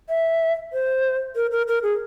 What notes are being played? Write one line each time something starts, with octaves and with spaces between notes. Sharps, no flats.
E5
C5
A#4
A#4
A#4
G#4